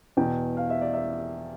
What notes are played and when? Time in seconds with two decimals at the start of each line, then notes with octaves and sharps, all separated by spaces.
0.17 E2 B2 G5
0.57 F5
0.70 E5
0.81 D5
0.94 E5